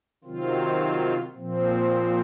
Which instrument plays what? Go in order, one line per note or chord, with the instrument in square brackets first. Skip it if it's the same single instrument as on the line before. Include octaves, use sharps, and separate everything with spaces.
[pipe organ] C3 D#3 F#3 C4 F4
A#2 F3 C4